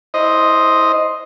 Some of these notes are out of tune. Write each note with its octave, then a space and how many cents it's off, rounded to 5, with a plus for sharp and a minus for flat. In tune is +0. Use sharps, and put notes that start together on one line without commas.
E4 -25 C5 +0 D#5 +0